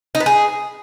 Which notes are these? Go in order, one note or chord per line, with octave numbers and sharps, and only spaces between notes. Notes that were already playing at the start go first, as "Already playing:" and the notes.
D#4
B3
G#4